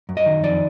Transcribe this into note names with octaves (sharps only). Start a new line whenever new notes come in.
F#2
D#5
D#3
F2 D5